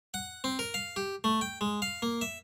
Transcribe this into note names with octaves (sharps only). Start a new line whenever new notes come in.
F#5
C4
A#4
F5
G4
A3
G5
G#3
F5
A#3
E5